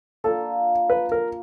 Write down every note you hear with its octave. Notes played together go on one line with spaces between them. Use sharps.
A#3 D4 F4 A4
B4
A#4